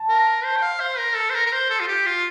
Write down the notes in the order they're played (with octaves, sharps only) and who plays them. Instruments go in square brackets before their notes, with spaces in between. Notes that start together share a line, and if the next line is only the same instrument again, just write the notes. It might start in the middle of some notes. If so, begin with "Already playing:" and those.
Already playing: [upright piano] A5
[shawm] A#4
C5
G5
F5
C5
A#4
A4
C5
A#4
A#4
C5
A4
F4
G4
F4